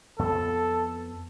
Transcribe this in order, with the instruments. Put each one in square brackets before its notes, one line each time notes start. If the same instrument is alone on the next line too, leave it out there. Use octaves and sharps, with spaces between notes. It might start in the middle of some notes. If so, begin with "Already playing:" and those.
[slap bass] F2 B3 [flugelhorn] A4